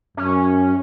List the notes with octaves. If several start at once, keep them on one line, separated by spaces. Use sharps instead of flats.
F#2 C#4